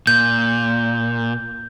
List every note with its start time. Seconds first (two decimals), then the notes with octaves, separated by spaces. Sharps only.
0.07 A#2 G6